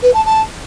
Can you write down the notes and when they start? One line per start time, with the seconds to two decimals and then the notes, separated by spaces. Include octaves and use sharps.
0.02 B4
0.14 A5
0.25 A5